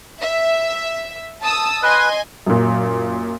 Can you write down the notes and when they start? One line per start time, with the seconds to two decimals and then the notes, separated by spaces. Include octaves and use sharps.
0.22 E5
1.41 A5 D#6 E6
1.83 B4 D#5 G#5 C6
2.47 F#2 A#2